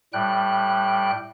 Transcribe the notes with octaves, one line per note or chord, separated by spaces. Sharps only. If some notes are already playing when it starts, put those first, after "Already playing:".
A2 G3 G5 F#6